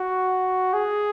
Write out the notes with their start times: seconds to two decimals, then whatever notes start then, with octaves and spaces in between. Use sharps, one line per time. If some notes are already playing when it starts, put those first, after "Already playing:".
Already playing: F#4
0.73 G#4